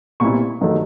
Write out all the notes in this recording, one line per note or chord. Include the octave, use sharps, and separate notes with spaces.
B1 A#2 G3 C4 E4 C#6
G2 D#3 F#3 A3